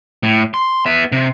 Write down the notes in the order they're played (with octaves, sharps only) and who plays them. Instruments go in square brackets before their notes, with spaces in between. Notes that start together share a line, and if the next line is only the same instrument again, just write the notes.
[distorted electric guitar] A2
C6
B3 E5
C3